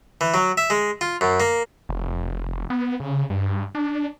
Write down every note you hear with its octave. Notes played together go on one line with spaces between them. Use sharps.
E3
F#3
E5
G#3
F4
F#2
A#3
F1
B3
C#3
G2
D4